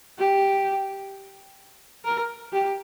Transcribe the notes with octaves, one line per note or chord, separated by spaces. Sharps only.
G4
A#4
G4